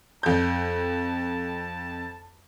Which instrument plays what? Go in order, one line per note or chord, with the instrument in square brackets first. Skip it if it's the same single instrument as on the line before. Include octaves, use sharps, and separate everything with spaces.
[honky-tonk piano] F2 G6 [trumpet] A5